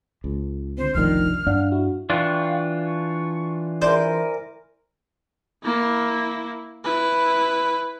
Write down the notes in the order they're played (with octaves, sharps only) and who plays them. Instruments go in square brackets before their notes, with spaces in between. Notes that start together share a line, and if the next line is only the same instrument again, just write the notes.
[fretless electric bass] C#2
[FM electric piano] D3 C4 [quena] C5
[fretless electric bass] F1 D#3 [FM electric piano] B1 F3 D4 [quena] F6
[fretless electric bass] G2 D4 [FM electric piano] F5 F#5
[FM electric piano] E4 F#4
[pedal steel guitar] E3 D4 F4 [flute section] F5 G5 C#6
[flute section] C#6
[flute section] E4 A#4 G#5 [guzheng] C5 [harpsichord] D5
[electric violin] A#3 E4
E4 B4